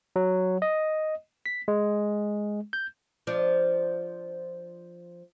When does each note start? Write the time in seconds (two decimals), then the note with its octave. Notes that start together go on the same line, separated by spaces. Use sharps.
0.16 F#3
0.62 D#5
1.46 B6
1.68 G#3
2.73 G6
3.27 F3 D4